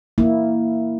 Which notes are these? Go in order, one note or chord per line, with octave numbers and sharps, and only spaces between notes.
A#3 E4